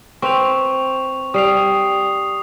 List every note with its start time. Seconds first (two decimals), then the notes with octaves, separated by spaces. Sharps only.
0.22 C4 B4 C#6 F7
1.34 G3 D#6 C7 F7